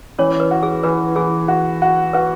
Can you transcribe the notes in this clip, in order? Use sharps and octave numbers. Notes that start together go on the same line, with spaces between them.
E3 C#4 C#5
B4
F#4
G#4
E3 B4
E3 G#4
F#4
F#4
F#4 B4